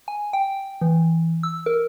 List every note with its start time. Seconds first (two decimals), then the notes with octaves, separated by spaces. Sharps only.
0.08 G#5
0.33 G5
0.81 E3
1.43 E6
1.66 A#4